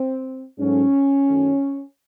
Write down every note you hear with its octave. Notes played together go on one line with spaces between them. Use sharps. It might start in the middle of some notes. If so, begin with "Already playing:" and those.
Already playing: C4
G#2 F#3 A3 C#4
F#2 D#3 F#3 A3